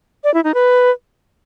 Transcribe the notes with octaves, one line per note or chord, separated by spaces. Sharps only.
D5
E4
D#4
B4